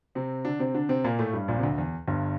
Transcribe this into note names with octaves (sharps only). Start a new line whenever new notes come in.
C3 C4
D3 D4
C3 C4
D3 D4
C3 C4
A#2 A#3
A2 A3
G2 G3
A#1 A#2
C3
D2 D3
E2
G1 G2